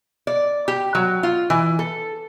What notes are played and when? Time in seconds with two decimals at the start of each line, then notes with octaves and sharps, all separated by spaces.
0.27 D5
0.68 G4
0.95 F#3
1.23 F4
1.50 E3
1.79 A4